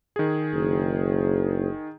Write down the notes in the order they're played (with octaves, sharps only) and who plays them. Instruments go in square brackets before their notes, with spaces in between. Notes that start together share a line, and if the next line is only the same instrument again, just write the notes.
[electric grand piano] D#3 G#4
[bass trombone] F#1